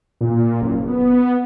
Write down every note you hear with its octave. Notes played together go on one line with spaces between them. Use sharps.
A#2
F#1
B3